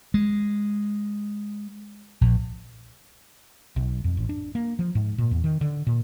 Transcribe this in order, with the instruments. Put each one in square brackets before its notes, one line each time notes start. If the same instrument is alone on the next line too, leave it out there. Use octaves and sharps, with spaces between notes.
[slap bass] G#3
A#1
[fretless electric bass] B1
F2
A1
D4
A#3
F3
G#2
A#2
E2
D#3
D3
A#2